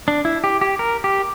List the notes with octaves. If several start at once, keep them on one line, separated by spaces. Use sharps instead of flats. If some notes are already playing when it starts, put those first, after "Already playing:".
D4
E4
G4
G4
A#4
G4